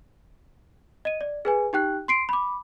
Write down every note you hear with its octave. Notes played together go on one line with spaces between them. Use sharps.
D#5 D#7
D5
G#4 B4 G#5
D#4 G4 G5 F#6
C6 C7 D7
B5 D6